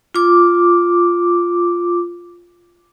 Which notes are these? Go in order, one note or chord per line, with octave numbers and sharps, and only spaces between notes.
F4 D6